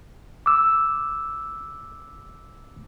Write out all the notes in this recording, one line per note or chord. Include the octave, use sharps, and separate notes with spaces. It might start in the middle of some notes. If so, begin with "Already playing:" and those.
D6 E6